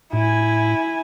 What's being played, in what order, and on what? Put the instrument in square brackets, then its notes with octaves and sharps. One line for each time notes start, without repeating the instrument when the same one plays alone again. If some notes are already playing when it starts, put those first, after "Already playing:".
[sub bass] A2 [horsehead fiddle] E4 G#5